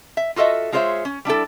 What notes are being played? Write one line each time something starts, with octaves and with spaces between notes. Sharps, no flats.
E5
F4 F#4 A4 D#5 E5
G#3 F4 G#4 C5 C#5 E5
C#4
G3 D4 E4 A4